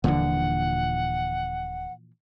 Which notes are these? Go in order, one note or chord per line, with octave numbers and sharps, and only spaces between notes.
D#1 A#2 D3 E3 F3 F#5